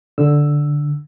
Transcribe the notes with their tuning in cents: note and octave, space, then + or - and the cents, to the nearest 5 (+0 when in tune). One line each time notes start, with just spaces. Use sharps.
D3 +0 E6 +0